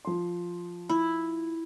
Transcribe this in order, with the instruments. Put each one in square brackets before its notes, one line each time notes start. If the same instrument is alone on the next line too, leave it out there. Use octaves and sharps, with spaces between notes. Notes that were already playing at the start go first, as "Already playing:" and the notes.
[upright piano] F3 C6
[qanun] E4